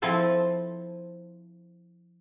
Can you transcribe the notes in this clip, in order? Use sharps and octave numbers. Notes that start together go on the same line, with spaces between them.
F3 C4 E4 A4 C5